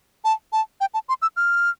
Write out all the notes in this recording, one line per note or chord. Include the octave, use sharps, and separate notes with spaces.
A5
A5
G5
A5
C6
E6
F6